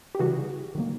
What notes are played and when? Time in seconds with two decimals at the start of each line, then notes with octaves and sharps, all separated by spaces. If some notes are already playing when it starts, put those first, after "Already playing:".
0.15 G4
0.19 C#3 E3 G3 F#4 G#4
0.75 D#3 F#3 A#3